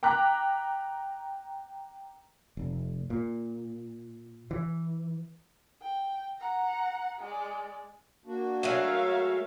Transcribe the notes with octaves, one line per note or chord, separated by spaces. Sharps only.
G5 A#5 D6 F#6 B6
F1
A#2
E3
G5
F#5 A#5
G#3 D5
A#3 D4 F#4
F#3 G#3 A3 A#4 E5 F5
C#5